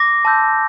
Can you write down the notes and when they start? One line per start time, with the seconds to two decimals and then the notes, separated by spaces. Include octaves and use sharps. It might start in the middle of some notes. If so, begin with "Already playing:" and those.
Already playing: D6 A#6
0.25 A5 C6 E6 G6